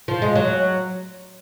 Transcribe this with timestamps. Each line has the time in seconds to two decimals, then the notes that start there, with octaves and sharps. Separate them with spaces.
0.08 F3
0.22 G#3
0.36 F#3